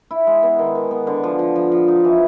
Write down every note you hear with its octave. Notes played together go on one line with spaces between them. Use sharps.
E4
G#3
B3
D#3
D#3
B3
D3
F3
F3
F3
F3
D#4
E3